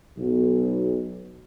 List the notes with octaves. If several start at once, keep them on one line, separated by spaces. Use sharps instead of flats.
B1